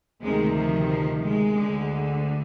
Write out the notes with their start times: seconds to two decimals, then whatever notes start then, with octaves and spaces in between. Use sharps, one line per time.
0.22 D2 C3 D#3 G#3
0.55 F3
0.89 F3
1.22 G#3
1.55 D2 D3